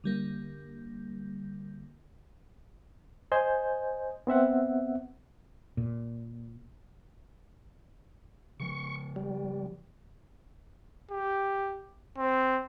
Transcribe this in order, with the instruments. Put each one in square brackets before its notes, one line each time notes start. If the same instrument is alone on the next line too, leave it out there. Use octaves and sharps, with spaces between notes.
[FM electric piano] D3 G3 A#3
[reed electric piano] C5 D#5 G#5 G6
B3 C4 E5 F#5
[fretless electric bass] A#2
[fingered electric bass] C#3 F3 [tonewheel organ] C#6
[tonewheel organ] G3
[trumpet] G4
C4